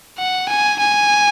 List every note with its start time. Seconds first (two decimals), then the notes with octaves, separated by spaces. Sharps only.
0.18 F#5
0.49 G#5
0.79 G#5